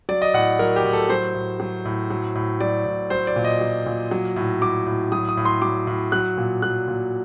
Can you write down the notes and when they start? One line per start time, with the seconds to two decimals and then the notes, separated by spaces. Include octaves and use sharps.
0.09 F#3 D5
0.22 D#5
0.34 A2 F#5
0.59 F#3 A#4
0.76 G4
0.84 A2
0.93 A4
1.09 F#3 C5
1.34 A2
1.60 F#3
1.85 A2
2.10 F#3
2.35 A2
2.60 F#3 D5
2.86 A2
3.10 F#3 C5
3.27 D5
3.36 A#2
3.45 D#5
3.61 F#3
3.86 A#2
4.11 F#3
4.36 A2
4.61 F#3 D6
4.86 A2
5.12 F#3 D#6
5.29 D#6
5.37 A2
5.45 C6
5.62 F#3 D6
5.87 A2
6.12 F#3 F#6
6.38 A#2
6.62 F#3 F#6
6.88 A#2